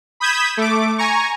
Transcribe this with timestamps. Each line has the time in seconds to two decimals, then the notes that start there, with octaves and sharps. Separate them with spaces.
0.20 B5 D#6 G6 G#6 B6 E7
0.57 A3 D6
0.98 G#5 A#5 C#6